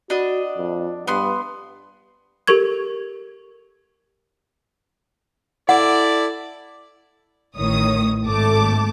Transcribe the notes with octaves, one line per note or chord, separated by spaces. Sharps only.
D4 F#4 D#5
F2
G2 B3 C6
G4 A4 A#4 C#6 G#6
E4 A4 D5 F#5
A1 A2 D#3 C#5 D#6
G#1 A3 A5 D6